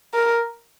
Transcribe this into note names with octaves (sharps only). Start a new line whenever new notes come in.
A#4